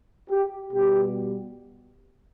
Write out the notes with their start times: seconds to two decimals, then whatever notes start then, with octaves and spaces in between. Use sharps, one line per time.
0.29 G4
0.73 B2 G3 B3 G4